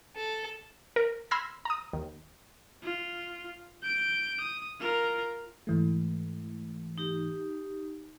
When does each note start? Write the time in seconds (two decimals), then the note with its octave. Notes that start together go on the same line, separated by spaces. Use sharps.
0.16 A4
0.96 A#4
1.31 B5 C6 E6 F6 G#6 A#6
1.65 A#5 D#6
1.93 D#2
2.83 F4
3.83 G6 D7
4.40 D#6
4.80 F4 A#4
5.67 G#2 E3 A3
6.98 D#4 G4